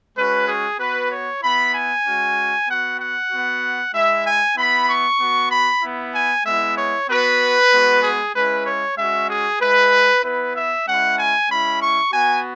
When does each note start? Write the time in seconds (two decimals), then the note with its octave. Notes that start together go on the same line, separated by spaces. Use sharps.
0.16 G#3 C#4 F#4 B4
0.48 G#4
0.79 B3 F#4 B4
1.11 C#5
1.42 B3 E4 B5
1.74 G#5
2.06 G#3 C#4 F#4
2.68 B3 F#4 F#5
3.00 F#5
3.31 B3 F#4
3.94 G#3 E4 E5
4.26 G#5
4.57 B3 E4 B5
4.88 C#6
5.19 B3 F#4
5.52 B5
5.82 B3 E4
6.14 G#5
6.46 G#3 B3 E4 E5
6.78 C#5
7.08 B3 F#4 B4
7.72 G#3 B3 F#4
8.03 G#4
8.35 G#3 C#4 E4 B4
8.66 C#5
8.97 G#3 C#4 F#4 E5
9.29 G#4
9.61 G#3 E4 B4
10.23 B3 E4 B4
10.55 E5
10.87 G#3 C#4 E4 F#5
11.18 G#5
11.49 G#3 C#4 E4 B5
11.81 C#6
12.13 B3 F#4 G#5